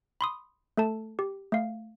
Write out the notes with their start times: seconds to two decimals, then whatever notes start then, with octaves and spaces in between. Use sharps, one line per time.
0.21 B5 C6 D#6
0.77 A3 A4 A5
1.19 G4
1.52 A3 F5